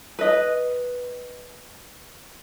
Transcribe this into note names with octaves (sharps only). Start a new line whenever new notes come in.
B4 D#5